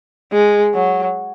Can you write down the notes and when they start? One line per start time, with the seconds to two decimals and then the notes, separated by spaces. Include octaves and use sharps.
0.33 G#3
0.74 F#3